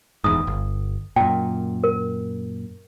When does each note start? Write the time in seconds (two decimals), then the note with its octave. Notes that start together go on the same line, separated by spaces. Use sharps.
0.24 D#1 E2 G#2 D#6
0.47 G1
1.16 F#2 A#2 G5
1.84 A#4